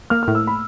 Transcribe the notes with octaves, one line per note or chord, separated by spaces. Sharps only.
A#3 F6
F6
A2
E6
B5